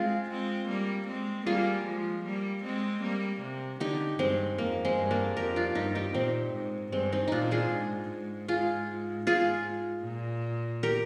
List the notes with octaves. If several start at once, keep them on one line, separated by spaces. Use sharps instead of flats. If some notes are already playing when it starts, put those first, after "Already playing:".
Already playing: G#3 C4 F4 G#4
G#3 C4
G3 A#3
G#3 C4
G3 A#3 F4 G#4
F3 G#3
G3 A#3
G#3 C4
G3 A#3
C3
D3 D#4 G4
G2 G#3 C4
F2 A#3
G#3 C4
G2
A#3 D4
F2 G4 A#4
D4 F4
G2 D#4 G4
D#4 G4
A#2 C4 D#4
G#2
G2 G#3 C4
C4 D#4
A#2 D4 D#4 F4
F4 G#4
G#2
G#2
F4 G#4
G#2 F4 G#4
A#2
G4 A#4